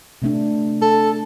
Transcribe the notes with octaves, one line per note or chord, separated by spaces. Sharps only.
C3 A3 D4
D4 A4